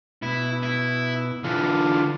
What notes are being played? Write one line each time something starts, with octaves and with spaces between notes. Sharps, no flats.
B2 E4
E4
D3 E3 D4 F4